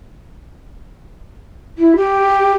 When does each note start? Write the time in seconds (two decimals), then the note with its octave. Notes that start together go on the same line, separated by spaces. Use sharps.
1.78 E4
1.96 G4